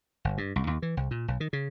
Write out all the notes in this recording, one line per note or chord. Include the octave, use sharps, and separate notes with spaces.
G1
G2
C2
D#2
E3
C2
A#2
B1
D#3
C#3